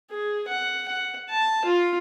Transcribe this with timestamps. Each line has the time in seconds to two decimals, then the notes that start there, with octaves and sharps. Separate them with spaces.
0.11 G#4
0.48 F#5
0.88 F#5
1.29 A5
1.65 F4